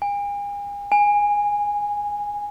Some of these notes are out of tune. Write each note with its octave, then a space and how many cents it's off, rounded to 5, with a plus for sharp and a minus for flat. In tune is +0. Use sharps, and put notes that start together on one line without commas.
G#5 -40
G#5 -10